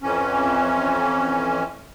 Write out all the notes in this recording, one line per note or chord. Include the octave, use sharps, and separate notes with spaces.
F2 E3 C#4